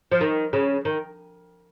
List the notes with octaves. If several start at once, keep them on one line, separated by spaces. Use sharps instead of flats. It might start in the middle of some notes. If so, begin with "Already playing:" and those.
F3
D#3
C#3
D#3